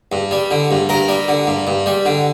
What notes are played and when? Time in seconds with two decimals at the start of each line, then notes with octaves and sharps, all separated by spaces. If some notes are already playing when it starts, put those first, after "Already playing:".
0.12 G2
0.31 G3
0.51 D3
0.71 G2
0.89 G2 A#4
1.08 G3
1.28 D3
1.47 G2
1.67 G2
1.86 G3
2.05 D3